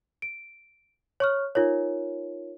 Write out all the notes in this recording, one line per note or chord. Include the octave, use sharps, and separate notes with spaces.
D7
C#5 C#6 F6
D#4 F4 A#4 C#5